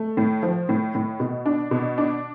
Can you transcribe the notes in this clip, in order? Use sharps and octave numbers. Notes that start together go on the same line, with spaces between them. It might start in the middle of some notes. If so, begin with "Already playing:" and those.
Already playing: A3
A2
F3
A2
A2
B2
D4
B2
D4